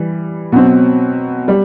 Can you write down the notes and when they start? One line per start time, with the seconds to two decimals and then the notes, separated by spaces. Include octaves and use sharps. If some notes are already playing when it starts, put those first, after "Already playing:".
Already playing: E3 G3
0.52 B2 F#3 C4
1.48 G3